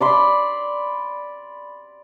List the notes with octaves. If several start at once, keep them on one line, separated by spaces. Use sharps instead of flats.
D5 B5 C6